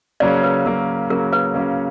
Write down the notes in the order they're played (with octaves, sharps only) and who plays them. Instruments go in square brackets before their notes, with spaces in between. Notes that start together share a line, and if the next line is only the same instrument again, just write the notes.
[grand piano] C#3 F#3 A#3 C#4 [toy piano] D5
[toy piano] B4
[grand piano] C#3 F#3 A#3 C#4 [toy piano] A#4
[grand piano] C#3 F#3 A#3 C#4 [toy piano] A#4
[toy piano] B4
[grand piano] C#3 F#3 A#3 C#4